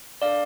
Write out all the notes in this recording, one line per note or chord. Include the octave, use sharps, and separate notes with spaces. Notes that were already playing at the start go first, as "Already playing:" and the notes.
D4 A4 D5 F5